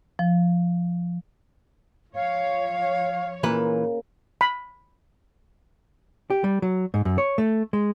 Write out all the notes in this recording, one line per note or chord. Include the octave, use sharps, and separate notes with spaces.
F3
F3 C#5 F5
A#2 C#3 E3 A#3 B4 A#5
B5
G4
G3
F#3
G#2
F#2
C#5
A3
G#3